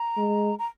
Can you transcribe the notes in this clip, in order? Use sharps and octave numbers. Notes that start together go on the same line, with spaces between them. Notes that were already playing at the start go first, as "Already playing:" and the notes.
Already playing: A#5
G#3
A#5